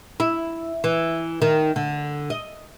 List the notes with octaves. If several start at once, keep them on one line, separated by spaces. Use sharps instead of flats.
E4
E3
D#3
D3
D#5